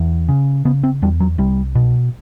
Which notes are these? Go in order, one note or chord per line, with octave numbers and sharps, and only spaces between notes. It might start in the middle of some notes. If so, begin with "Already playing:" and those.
Already playing: E2
C#3
C#3 B3
C4
E2 G3
F#3
C2 G3
B2